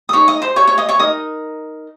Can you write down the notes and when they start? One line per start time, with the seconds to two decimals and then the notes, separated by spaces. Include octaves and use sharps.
0.09 D#6
0.13 D#4 G#4 C#5 C#6
0.28 D#5 D#6
0.42 C5 C6
0.56 C#5 C#6
0.67 C#5 C#6
0.78 D#5 D#6
0.89 C#5 C#6
0.99 D#4 A#4 D#5 D#6